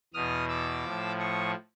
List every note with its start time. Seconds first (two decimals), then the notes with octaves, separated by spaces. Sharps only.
0.14 E2 B2 D#6 F6
0.49 D6 E6
0.84 A2 F3
1.19 C#6 D#6